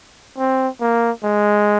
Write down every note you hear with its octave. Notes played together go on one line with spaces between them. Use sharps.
C4
A#3
G#3